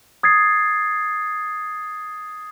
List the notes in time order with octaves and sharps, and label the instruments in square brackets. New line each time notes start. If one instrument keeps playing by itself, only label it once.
[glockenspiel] D#6 G#6 A6 C7